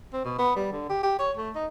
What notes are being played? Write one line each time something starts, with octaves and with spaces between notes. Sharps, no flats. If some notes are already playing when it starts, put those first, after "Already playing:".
C4
B2
B3
G3
D3
G4
G4
C#5
A3
D#4